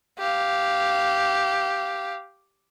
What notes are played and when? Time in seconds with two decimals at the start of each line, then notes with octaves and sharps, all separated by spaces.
0.19 G4 F5